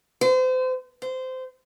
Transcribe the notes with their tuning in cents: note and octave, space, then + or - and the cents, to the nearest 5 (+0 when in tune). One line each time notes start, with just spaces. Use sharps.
C5 -35
C5 -20